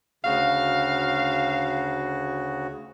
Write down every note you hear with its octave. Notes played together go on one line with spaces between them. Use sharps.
D2 C#3 F#4 F5